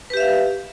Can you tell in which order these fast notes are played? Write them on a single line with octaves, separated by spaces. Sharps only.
B4 G4 E5 F5